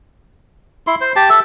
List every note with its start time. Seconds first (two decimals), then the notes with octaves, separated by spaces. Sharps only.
0.87 E4 C6
1.01 C5
1.16 G4 A5
1.30 A4 E5